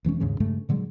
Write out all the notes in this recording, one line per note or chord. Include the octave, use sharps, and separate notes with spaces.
E1 E3 G#3 C#4
D#2 G#2 C#3 G#3
G2 C#3 G#3 A3
A#2 D3 F#3 G#3